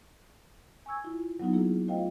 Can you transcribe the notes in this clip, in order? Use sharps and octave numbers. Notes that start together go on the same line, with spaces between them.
G#5 C#6 E6 G#6
E4 F4
F#3 B3 D#4 F4
A#3 E4 G#4
A3 F4 C5 D#5 F5 G5